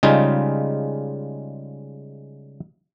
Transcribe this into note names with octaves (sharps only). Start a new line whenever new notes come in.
C#3 G3 G#3 D#4 F4